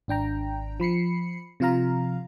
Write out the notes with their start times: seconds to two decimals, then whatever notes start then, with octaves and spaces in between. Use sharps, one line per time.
0.08 G#1 D4 G5 A#5
0.80 F3 B5 C7 C#7
1.60 C3 F3 F4 F5 A#5